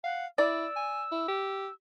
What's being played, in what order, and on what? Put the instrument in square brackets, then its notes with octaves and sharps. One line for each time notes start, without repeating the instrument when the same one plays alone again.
[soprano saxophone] F5 [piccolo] F#5
[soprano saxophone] E4 [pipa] D5 [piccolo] E6
[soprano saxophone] G#5
E4
G4